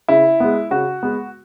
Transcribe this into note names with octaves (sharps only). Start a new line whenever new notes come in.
C#3 E4
G#3 B3
C#3 F#4
G#3 B3